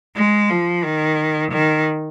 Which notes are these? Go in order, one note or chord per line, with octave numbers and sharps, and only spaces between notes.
G#3
F3
D#3
D#3